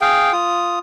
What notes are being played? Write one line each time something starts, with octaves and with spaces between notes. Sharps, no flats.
G#4 F5 G5
F4 D#6